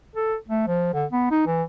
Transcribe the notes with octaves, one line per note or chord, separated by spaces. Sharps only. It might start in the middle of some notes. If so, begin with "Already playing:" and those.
A4
A3
F3
D3
B3
D#4
E3